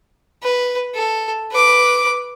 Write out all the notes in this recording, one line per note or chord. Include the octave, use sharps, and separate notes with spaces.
B4
A4
B4 D6